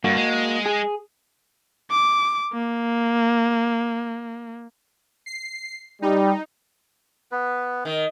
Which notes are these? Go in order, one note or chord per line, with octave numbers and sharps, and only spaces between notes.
G2 A#3 F#4
G#3
G#4
D6
A#3
C7
G3 D#4
B3 B4
D#3